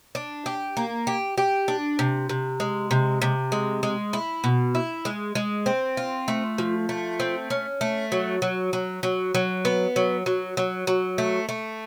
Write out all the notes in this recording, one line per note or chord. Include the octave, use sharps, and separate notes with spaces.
D4
G4
A#3
G4
G4
D4
C3
C3
G#3
C3
C3
G#3
G#3
E4
B2
E4
G#3
G#3
C4
F4
A3
F3
A3
C4
C#4
A3
F#3
F#3
F#3
F#3
F#3
B3
F#3
F#3
F#3
F#3
A3
A3